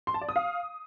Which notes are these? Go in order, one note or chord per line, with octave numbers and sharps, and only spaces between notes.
C6
A5
D5
D#6
F5